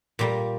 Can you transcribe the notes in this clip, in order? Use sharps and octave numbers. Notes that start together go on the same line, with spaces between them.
A#2 G3 A#3